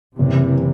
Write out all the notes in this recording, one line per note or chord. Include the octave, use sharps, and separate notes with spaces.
F#1 C3 E3